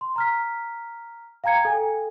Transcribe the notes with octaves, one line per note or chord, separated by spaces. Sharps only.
C6
A#5 F6 B6
F5 G5 A#5 G#6 C#7
A4 G5 G#5